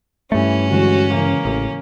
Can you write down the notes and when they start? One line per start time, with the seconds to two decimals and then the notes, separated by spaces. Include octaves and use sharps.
0.32 G2 E3 A3 C#4
0.71 D3 E3 G#3 F#4
1.14 C#3 E3 A#3
1.45 A1